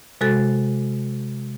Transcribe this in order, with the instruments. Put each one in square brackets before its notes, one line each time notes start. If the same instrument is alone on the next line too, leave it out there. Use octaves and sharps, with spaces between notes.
[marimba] C3 G#3 F#4 A4 A6